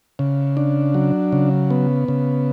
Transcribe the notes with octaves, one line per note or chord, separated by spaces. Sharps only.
C#3
D4
F#3
C#3
B3
C#3